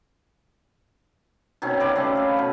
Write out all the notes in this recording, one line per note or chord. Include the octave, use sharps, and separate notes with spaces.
B2 D#3 C4 C#4
C#3 B4 D5
C#3 A3 C4
B4 F5
B2 C#5 B5